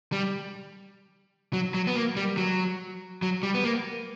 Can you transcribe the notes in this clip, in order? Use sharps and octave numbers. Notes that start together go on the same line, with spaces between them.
G3
F#3
F#3
B3
A#3
G3
F#3
F#3
G3
B3
A#3